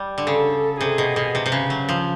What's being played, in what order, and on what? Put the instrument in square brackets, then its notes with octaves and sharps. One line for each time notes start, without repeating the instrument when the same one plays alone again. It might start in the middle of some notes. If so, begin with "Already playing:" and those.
Already playing: [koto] G3
D3
[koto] C#3 [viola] A4
[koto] C3 [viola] G#4
[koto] B2
B2
C3
C3
C#3
F#3
F3